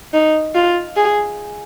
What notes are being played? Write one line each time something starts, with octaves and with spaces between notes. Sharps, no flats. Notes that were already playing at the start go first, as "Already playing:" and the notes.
D#4
F4
G#4